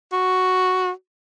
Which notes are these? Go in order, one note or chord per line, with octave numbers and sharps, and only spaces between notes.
F#4